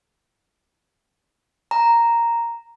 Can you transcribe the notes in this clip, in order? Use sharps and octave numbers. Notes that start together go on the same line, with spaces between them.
A#5